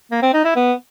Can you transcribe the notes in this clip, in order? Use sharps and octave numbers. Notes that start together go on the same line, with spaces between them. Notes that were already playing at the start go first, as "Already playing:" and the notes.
A#3
C4
D#4
E4
B3